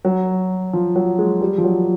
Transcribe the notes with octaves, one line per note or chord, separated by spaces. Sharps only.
F#3
F3
F#3
G#3
G3
F3
F#3